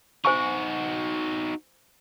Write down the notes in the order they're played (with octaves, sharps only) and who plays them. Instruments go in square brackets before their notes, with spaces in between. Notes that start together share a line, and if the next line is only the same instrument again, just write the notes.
[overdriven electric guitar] D#4 F#4 [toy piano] C5 G#5 C#6